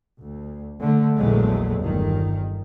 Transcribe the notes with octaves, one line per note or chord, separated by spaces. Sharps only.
D2
D3 A3
A#1 E2 F#3 G#3 A3
G1 D#3